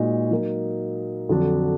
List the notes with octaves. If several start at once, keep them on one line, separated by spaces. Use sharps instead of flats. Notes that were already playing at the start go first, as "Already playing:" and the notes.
Already playing: A#2 G#3 D#4 F#4
F#3 A#3 D#4 A#4
F2 D3 F#3 D4